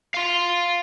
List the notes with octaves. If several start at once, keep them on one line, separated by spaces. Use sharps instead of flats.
F5 C6